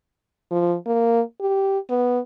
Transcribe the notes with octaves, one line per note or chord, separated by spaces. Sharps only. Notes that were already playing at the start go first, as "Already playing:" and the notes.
F3
A#3
G4
B3